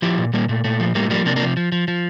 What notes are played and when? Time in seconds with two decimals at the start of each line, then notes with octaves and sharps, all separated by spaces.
0.02 F3 E4 G4
0.18 A#2
0.33 A#2 G3 A#3
0.49 A#2 A3
0.64 A#2 A3
0.80 F3
0.95 A2 G3 A#3
1.10 F3 G3 A#3
1.26 C3 A#3 D4
1.36 A#3 D4
1.42 F3
1.57 F3
1.72 F3
1.88 F3